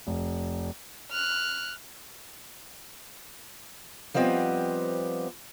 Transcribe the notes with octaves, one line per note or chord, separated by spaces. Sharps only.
F1
F6 F#6
F3 G3 B3 C4 D#5